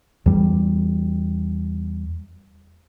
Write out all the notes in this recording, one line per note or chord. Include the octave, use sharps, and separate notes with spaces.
E2 G3